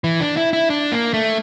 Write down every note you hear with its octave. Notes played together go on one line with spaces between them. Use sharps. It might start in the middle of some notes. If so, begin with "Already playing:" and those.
E3
D4
E4
E4
D4
A#3
A3